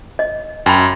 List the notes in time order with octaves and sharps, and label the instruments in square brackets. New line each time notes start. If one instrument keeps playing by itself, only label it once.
[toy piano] D#5
[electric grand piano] F#2 [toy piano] G5 A5 B5